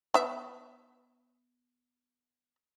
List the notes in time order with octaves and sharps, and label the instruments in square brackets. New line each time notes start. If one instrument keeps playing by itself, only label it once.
[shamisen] B3 E5